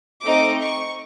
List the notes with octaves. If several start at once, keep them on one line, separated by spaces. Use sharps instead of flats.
A3 C4 D#4 D6
C#6